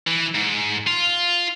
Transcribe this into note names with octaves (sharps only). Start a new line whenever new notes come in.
E3
G#2
F4